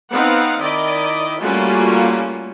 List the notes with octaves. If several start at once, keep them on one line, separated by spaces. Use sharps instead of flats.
B3 C4 D#4 F5 F#5
D#3 E4 D5 D#5
G3 A3 A#3 C#4 F4 F#4